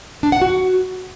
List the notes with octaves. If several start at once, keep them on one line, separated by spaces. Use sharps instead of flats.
D4
F#5
F#4